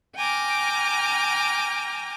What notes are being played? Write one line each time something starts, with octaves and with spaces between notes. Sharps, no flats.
G5 G#5 A#5 D6 F6